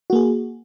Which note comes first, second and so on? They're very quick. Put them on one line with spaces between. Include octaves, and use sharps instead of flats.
F#4 A#3 G#4